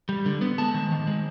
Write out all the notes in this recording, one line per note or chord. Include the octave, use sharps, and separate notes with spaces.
G3
D3
B3
G#3 A5
D#3
D#3
G#3